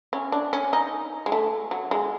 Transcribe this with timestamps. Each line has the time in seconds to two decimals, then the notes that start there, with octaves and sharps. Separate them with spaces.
0.13 C#4
0.32 D4
0.53 C#4
0.73 D#4
1.26 G#3
1.32 A3
1.71 F#3
1.91 G#3